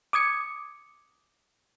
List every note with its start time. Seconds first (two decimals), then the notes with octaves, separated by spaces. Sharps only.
0.13 D6 D#6 G#6 C#7